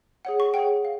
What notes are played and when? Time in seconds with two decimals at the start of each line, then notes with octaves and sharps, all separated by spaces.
0.25 G#4 C#5 F#5
0.40 C#6
0.54 G#4 C#5 F#5 G5
0.85 F5